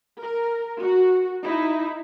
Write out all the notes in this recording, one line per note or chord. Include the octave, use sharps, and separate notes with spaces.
A#4
F#4
D#4 E4